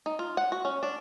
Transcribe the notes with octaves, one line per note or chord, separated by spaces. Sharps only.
D#4
F4
F#5
F#4
C#4
D4